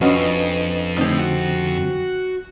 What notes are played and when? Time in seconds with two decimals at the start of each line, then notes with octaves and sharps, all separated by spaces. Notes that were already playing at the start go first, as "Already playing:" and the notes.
0.01 F2 C#4 D4 F4 F#4 B4 D#5
0.98 A2 D3 C4 D#4 G4
1.19 F#4